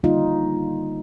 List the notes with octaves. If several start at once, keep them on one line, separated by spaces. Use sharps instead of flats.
D3 G3 A#3 D#4 F4